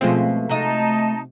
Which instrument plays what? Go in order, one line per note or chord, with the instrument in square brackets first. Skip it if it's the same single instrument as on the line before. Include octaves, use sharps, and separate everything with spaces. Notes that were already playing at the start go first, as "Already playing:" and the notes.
[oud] B2 C#4 F4 [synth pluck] F3 G#3 C4 [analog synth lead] A3
[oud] C3 F#4 D#5 [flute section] D#4 A5 A#5